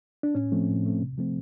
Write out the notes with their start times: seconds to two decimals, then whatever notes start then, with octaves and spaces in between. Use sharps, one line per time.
0.23 D4
0.35 A2 C#4
0.52 F3 A3 C4
0.68 A2
0.84 F3 A3 C4
1.01 C3
1.18 F3 A3 C4